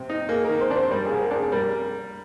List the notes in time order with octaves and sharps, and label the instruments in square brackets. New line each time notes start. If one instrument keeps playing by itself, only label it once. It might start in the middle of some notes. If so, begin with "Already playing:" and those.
Already playing: [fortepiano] C3
D#4
[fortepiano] A#3 [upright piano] G#4
[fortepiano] D#3 [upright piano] A#4
[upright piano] C5
[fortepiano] D4
[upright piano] C5
[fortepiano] G3 [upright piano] A#4
[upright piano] G#4
[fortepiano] C2
[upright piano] A#4
[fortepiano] D4
[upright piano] G#4
[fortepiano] G3 [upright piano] A#4